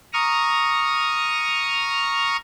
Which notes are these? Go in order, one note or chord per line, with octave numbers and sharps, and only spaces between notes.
A#5 C#6 D#6 F6